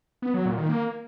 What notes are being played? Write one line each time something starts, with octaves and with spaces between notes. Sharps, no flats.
B3
F#3
A#2
D#3
A#3